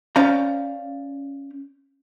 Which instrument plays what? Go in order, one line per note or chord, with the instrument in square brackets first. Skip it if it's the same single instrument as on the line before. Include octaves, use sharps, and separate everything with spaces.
[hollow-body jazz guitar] C#4 C5 D5 F5 A#5